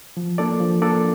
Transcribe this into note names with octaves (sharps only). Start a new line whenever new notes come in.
F3
A#3 D4 A4 D5
F3
A#3 D4 A4 D5